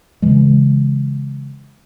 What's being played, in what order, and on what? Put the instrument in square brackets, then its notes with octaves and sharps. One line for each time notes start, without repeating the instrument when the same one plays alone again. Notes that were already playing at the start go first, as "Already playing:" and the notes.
[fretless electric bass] C#3 E3 G#3